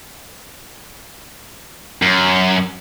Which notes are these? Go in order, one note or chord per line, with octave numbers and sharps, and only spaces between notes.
F#2